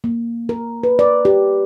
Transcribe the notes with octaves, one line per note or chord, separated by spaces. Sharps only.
A#3
A#4
B4
D5
G4